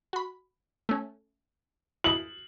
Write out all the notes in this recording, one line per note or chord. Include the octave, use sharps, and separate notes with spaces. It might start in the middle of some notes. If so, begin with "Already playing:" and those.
F#4 B5
A3 C#4
E4 D#5 F#7